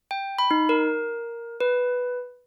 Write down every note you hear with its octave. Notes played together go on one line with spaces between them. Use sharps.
G5
B5
D#4
A#4
B4